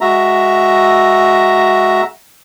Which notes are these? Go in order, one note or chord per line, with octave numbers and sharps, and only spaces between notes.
G#3 F#4 E5 A#5